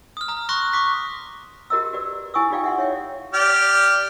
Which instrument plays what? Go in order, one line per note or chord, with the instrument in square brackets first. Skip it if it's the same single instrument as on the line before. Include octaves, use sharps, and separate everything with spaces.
[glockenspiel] D#6 F6
A#5 D#6 F6
C6 C#6 D#6 F#6 A#6
C#6 D6 B6
[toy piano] F#4 G4 A#4 D#5 A#5 E6
F#4 G4 B4 D5
E4 G#5 C#6 D#6 E6
D#4 F4 G4 D5 F5 G5
E5 F#5 C6
C#5 E5 G5
[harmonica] G4 D5 F6